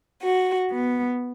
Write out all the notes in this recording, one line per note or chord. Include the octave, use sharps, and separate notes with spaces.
F#4
B3